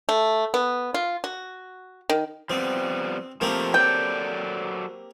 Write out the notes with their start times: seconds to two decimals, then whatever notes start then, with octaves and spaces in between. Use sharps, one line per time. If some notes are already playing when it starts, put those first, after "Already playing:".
0.09 A3
0.54 B3
0.94 F4
1.24 F#4
2.09 D#3
2.50 F3 G3 B3 C4
3.41 F3 A3 A#3 C4 G4
3.74 F#3 A4 D5 G5